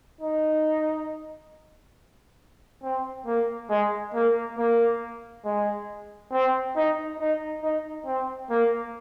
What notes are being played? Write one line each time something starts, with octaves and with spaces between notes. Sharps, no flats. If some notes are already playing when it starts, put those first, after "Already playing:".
D#4
C4
A#3
G#3
A#3
A#3
G#3
C4
D#4
D#4
D#4
C4
A#3